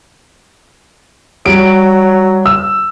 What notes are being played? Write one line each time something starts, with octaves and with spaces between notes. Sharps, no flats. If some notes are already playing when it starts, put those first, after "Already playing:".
F#3 G3 D7
E6